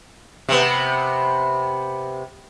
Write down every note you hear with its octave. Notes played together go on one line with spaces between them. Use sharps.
C3 B3